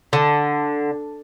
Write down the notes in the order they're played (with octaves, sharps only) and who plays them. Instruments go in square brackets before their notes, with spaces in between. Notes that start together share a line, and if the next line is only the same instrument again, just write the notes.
[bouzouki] D3